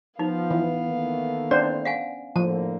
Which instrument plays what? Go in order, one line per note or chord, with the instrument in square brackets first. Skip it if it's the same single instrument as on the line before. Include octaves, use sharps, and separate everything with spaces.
[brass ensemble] F3 [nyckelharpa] B3 F5 [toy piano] D#4
[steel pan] E3
[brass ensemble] D#3 A3 A#3
[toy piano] C#4 D5 [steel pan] D4 C5
[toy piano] F5 F#5 G#5
[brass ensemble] A2 D3 A#3 [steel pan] F3 [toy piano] A5